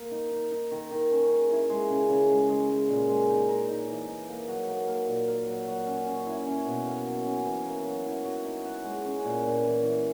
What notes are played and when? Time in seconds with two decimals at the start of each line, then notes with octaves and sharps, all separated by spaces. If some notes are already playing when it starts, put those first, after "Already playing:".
Already playing: A#3
0.11 D#4
0.31 D#4
0.51 D#4
0.72 D#3
0.91 D#3
1.11 C#4
1.31 G#4
1.50 E4
1.70 G#3
1.90 C#3
2.09 C#3
2.30 G#3
2.49 G#3
2.69 G#3
2.89 A#2
3.09 G#3
3.29 D#4
3.49 A#4
3.68 D#4
3.88 E3
4.08 D#4
4.29 A#3
4.48 F#3
4.68 A#3
4.88 A#3
5.08 A#2
5.28 A#4
5.47 F#3
5.67 F#3
5.86 C#4
6.06 C#4
6.27 E4
6.47 C#4
6.66 B2
6.86 A#3
7.06 F#3
7.26 C#4
7.45 E3
7.66 A#3
7.85 F#3
8.06 E4
8.25 F#3
8.44 D#4
8.65 F#4
8.84 G#3
9.05 C#4
9.25 A#2
9.44 A#2
9.64 E3
9.83 E3